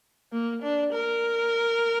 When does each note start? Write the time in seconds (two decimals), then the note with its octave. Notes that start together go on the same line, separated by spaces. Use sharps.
0.32 A#3
0.62 D4
0.93 A#4